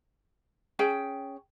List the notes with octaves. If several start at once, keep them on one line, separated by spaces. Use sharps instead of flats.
C#4 G#4 G5